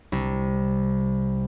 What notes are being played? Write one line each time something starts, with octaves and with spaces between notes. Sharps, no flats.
C2